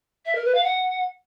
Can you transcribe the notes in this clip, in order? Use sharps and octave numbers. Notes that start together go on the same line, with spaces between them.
E5
A#4
B4
F5
F#5